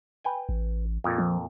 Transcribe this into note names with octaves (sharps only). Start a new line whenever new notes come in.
B4 G5 G#5
A1
F2 A#2
F3